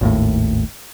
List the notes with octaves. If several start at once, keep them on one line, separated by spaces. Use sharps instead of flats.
G#1 D#2 A2